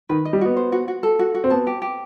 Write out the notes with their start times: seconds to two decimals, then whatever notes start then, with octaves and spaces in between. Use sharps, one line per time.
0.09 D#3 B4
0.25 D#5
0.33 G3
0.41 B3 F#4
0.57 C5
0.72 F#4
0.88 F#4
1.03 A4
1.19 F#4
1.34 F#4
1.44 C4
1.50 B3 A5
1.67 G4
1.82 G4